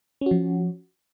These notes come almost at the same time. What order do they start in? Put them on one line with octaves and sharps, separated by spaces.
C#4 F#4 F3